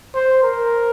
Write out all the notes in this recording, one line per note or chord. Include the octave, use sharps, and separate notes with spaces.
C5
A#4